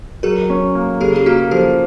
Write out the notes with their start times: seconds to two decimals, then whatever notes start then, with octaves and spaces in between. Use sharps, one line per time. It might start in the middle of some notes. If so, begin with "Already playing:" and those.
0.23 F#3 G#4 A#4
0.50 C#4
0.75 A#3
1.01 C#3 G4 A4
1.16 G4
1.26 A#3 F#4 G#4
1.51 F3 G4 A4